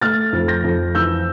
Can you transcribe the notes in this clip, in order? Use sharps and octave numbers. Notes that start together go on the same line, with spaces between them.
A3 F6 A6
F2
G6 A#6
F2
E3 E6 G6